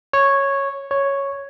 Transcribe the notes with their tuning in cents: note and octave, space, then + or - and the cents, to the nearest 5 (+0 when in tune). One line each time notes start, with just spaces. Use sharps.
C#5 -5
C#5 +0